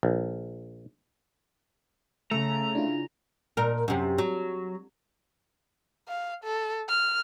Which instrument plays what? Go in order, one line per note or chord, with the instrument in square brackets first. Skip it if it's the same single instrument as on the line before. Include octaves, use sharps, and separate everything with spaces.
[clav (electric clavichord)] A#1
[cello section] C#3 [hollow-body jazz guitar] A3 [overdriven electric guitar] A#5 [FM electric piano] E6
[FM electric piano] D4 E4 F4
[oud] A#2 A#4
F#2 C3
F#3
[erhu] F5
A4
F6